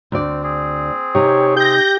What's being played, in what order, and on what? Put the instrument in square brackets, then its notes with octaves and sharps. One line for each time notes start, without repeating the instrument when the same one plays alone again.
[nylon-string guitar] D2 D5 [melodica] C4
[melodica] C4 G#4
[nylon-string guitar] C3 D#4 [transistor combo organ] G4 C#5
[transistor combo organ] G4 [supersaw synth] G6 A#6